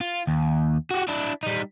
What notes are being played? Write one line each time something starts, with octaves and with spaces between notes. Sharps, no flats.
F4
D#2
F#4 G4
D4 E4
G3 D#4